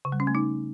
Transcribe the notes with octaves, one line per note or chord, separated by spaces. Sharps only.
C#3
G3
C#4
A3
D#4